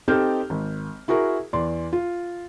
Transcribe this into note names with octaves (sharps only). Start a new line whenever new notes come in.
C4 D#4 G4 A4 F6 G6
G#1
E4 F#4 G#4 A#4
E2 D5 C6
F4